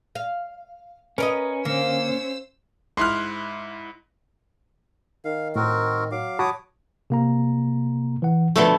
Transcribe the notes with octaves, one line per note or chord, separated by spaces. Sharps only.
F5
C#4 A#4 B4 D5 D#5
D3 A#3 C5 E6
G#2 E4 C6 F6 F#6
D#3 F5
A2 C4 F#4 A#4
F#3 F5 D6
F#4 C#5 A5 B5 D6 D#6
C3 A#3 A#5
E3 F#5
B2 D3 F3 A3